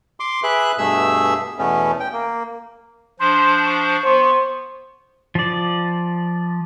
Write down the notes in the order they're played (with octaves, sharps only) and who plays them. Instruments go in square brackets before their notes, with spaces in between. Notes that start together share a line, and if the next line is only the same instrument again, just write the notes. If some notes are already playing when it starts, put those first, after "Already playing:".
[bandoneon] C6 D6
G#4 B4 E5 F#6
G2 B2 A3 G#4 E5 E6
E2 B2 A3 B3 C#4
G5
A#3
[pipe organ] F3 D4 C5 [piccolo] C6
[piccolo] C#6
[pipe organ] B3 [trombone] C5
[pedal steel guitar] F3 D5